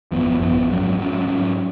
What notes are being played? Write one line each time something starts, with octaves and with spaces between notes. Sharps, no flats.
G#1 F#2 F3 B3
G#1 F#2 F3 B3
G#2 F#3 C#4
G#2 F#3 C#4
G#2 F#3 C#4